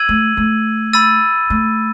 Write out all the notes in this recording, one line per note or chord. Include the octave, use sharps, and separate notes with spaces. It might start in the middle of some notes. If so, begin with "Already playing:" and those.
Already playing: E6 G#6 D#7 F#7
A3
A3
B5 E6 A6 D#7
A3